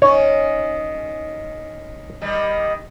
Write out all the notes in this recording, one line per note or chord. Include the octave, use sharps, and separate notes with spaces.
D#3 C#4 D#4 C#5
D#3 G3 D#4